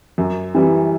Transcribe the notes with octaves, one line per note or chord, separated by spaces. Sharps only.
F#2
E3 G3